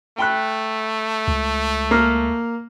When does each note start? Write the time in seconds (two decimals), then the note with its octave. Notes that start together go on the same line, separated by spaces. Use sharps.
0.18 A3 G5 B5 F#6
1.28 C#2
1.91 A#3 A#5 F6